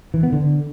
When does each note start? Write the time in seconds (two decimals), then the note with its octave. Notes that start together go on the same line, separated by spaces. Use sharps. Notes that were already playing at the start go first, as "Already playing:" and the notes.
0.14 E3
0.23 B3
0.32 D3